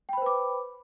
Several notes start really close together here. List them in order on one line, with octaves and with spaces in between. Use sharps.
G5 B5 C5 B4 D6